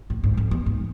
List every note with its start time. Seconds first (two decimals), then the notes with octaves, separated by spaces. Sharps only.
0.10 A2
0.24 G#2
0.37 F2
0.51 E2
0.66 G#2